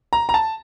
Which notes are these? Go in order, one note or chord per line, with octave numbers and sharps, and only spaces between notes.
A#5
A#5
A5